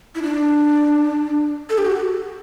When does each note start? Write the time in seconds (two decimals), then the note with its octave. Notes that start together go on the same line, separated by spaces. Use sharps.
0.15 E4
0.22 D4
1.70 A4
1.78 G4
1.86 F#4